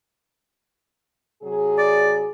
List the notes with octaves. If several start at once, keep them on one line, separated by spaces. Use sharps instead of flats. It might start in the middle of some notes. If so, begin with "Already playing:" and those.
C3 F#3 G#4
D5